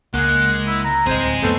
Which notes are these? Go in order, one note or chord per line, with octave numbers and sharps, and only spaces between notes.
C#2 G#3 A#3 F#5
E4
A#5
D1 C2 C4 G#4 C5 D#5
F2 G#2 A3 B3 A4 C5